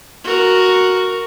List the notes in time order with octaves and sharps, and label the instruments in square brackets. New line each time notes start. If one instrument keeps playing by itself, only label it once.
[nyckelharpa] F#4 A#4